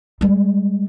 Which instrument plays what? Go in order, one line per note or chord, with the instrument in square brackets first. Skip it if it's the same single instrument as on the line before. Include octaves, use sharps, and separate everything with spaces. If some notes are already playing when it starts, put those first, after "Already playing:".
[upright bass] G3 G#3